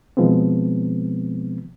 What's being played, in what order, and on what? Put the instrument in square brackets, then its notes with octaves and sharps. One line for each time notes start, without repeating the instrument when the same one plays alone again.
[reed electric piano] B2 D#3 F3 G#3 B3 C4